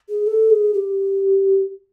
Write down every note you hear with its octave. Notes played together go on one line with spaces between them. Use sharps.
G#4
A4
G#4
G4